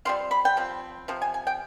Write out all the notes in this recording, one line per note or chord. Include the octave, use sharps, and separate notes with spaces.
G3 C4 F4 C6
B5
G5
F3 C4
C3 F3
G#5
G#5
G5